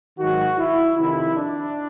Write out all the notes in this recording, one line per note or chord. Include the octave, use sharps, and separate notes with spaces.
G#2 D#3 F#3 F#4
E4
F2 C3 D#3 E4
D4